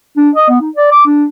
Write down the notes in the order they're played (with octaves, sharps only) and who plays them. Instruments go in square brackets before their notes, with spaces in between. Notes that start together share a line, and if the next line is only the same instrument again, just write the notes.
[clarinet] D4
D#5
B3
D#4
D5
D6
D4